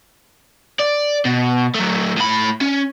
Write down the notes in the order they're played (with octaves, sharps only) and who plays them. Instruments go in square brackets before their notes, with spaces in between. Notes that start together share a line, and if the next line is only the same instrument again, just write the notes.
[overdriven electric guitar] D5
B2
F#3 A3
A2 B5
C#4